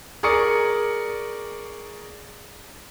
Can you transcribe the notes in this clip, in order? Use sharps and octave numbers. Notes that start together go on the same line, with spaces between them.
G#4 A#4 D5 C#6 D#6 C#7